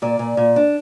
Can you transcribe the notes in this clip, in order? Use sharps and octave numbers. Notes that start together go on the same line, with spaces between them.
A#2 D5
A#2
A#2
D4